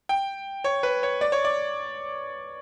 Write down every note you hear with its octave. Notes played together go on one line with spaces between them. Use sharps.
G5
C#5
B4
C#5
D5
C#5
D5